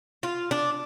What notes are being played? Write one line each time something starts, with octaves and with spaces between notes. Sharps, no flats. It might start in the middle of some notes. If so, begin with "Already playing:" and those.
F4
D4